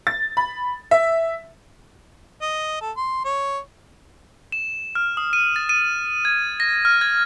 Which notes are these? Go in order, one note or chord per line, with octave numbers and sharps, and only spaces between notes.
A6
B5
E5
D#5
A4
C6
C#5
E7
F6
D#6
D#7
A6
D#7
G#6
A#6
F6
G#6